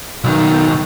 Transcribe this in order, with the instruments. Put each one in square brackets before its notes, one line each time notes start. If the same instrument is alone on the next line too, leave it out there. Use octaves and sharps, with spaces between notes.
[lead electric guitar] B1 D#3